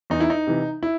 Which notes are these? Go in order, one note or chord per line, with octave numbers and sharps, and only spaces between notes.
E2 D#4
E4
D#4
C3 E3
E4